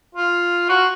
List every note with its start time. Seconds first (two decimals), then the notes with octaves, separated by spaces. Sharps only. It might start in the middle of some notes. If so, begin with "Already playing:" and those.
0.15 F4
0.69 F#4